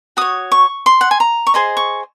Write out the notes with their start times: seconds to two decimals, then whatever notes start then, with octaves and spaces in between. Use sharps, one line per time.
0.17 F#4 C#5 D#6
0.52 C#6
0.86 C6
1.01 F#5
1.11 G#5
1.20 A#5
1.47 C#6
1.54 G#4 C5 D#5 C6
1.77 C#6